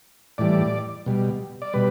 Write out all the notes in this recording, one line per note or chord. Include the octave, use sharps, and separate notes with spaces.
A2 E3 G3 D5
B2 G3
D5
B2 G3 B4